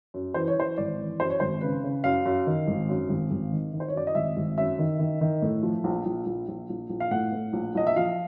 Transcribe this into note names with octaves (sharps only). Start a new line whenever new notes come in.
F#2
E3 C5
C#5
E3 C5
G#1 D5
E3
F#2 C5
C#5
G#1 C5
C#3 B4
C#3
F#2 F5
F#2
D#3
G#1
F#2
G#1
G#1
D#3
D#3
C5
C#5
F#2 D5
D#5
G#1 E5
G#1
F#2 E5
D#3
D#3
D#3
A2
F3
A#1
A#1
A#1
A#1
A#1
A#1
F5
A2 F#5
A2
A#1
A#1 D#5
E5
F3 F5